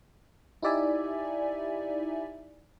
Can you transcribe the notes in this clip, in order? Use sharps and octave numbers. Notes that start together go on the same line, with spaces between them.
D#4 E4 G4 D5 E5 G#5